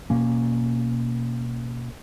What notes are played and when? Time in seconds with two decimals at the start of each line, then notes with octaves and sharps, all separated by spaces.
0.10 B2 A#3 C#4